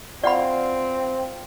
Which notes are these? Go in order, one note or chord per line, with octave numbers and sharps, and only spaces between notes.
C4 F4 D5 F#5 B5